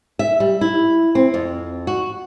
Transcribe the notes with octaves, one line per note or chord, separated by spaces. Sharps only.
E5
G3
E4
C4
F2
F#4